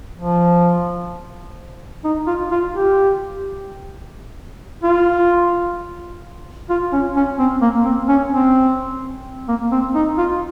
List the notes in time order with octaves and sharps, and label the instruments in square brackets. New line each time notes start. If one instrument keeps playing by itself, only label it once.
[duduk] F3
D#4
F4
F4
G4
F4
F4
C#4
C#4
C4
A#3
C4
C#4
C4
A#3
C4
D#4
F4